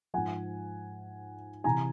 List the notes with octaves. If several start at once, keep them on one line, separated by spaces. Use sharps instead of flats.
G#2 F3 F#5 G#5
C3 E3 G#5 A#5